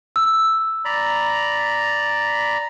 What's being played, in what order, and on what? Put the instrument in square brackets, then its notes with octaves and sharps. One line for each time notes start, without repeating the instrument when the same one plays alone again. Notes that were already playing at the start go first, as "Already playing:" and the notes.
[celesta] E6
[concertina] D5 A#5 B5